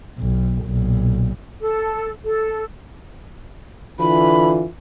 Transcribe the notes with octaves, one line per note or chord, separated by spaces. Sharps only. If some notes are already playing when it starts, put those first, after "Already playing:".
B1
B1 A#2
A4
A4
D3 E3 F4 B5